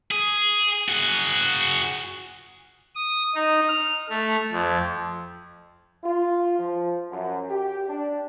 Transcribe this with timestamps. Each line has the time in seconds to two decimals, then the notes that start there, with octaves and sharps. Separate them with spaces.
0.11 G#4
0.89 F#4 G#4
2.95 D#6
3.35 D#4
3.68 F6
4.09 A3
4.52 F2
6.04 F4
6.59 F3
7.12 F#2
7.50 G4
7.89 D4